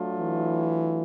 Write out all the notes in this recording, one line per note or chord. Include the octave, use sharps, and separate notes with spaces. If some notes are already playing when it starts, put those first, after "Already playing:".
Already playing: F#3 A3 D4 F4
E3